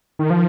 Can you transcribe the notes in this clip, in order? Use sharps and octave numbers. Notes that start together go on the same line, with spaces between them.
D#3
F3